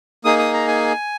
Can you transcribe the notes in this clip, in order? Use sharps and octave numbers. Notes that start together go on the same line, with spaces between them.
A#3 D#4 G#4 D#6
D#6
A#5
G#5